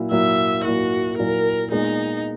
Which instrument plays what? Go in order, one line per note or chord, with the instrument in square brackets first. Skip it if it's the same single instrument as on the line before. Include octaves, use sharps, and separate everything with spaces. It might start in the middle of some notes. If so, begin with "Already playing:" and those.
Already playing: [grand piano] A#2 F#3 A#3 E4
[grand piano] A#2 F#3 A#3 E4 [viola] E5
[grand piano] A#2 F#3 A#3 E4 [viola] F#4
[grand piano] A#2 F#3 A#3 E4 [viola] A#4
[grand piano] A#2 G#3 B3 [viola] D#4